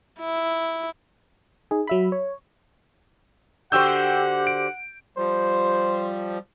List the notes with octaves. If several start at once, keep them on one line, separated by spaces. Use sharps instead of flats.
E4
D#4 G#4
F#3 E5 B5
C#5
D3 F#4 G4 C5 F#5 G5 E6 G6
D7
F3 G3 C5